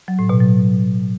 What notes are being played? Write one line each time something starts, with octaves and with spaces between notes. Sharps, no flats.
F#3
A2
B2
F#3